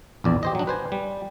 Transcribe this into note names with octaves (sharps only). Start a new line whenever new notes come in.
A#1 E2 D5
G4 C5 D#5
F#3 D4
B4 C5 G#5
G3